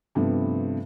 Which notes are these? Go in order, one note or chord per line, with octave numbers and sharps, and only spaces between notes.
G2 C3 F3 A3 B3